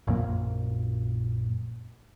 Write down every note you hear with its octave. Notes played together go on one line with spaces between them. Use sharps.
A#1 F#2 A#2 A#3